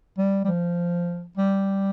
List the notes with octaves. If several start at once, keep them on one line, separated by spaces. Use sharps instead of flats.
G3
G3
F3
G3